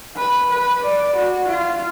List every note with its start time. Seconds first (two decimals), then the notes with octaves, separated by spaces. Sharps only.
0.17 B4
0.50 B4
0.84 D5
1.16 F#4
1.48 F4